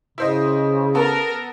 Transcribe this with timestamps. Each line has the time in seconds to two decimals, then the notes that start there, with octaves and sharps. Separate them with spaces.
0.18 C#3 E4 C5 D#5
0.95 B3 A4 A#4 A5